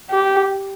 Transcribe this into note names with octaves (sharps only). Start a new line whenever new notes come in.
G4